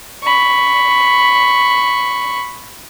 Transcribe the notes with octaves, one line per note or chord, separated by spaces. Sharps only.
B5 C#6